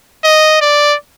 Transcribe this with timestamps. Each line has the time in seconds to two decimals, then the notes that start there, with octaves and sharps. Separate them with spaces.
0.24 D#5
0.62 D5